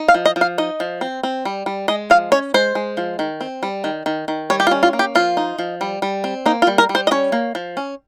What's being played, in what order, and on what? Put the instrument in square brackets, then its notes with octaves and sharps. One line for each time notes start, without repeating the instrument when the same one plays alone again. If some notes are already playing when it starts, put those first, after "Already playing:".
Already playing: [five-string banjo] D#4
F5
F3
D#5
F3
F5
D#4 D#5
F3
C4
C4
G3
G3
G#3 D#5
F3 F5
C#4 C#5
G#3 C5
G#3
F3
D#3
C4
G3
D#3
D#3
D#3
G3 C#5
G4
F4
C#4
F4
A#3
G4
F3 F4
D#4
F3
G3
G3
C4
A#3 D#4
F4
G3
A#4
G3
C5
D#5
C#4 C#5
A#3
F3
C#4